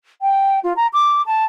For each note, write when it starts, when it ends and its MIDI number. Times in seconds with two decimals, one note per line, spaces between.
0.21 0.59 79
0.63 0.73 65
0.76 0.87 82
0.93 1.22 86
1.26 1.45 81